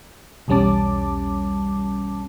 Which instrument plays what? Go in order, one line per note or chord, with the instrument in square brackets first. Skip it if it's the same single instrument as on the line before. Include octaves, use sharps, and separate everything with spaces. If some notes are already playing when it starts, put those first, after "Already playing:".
[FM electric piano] B1 E2 G3 C#4 A5 D6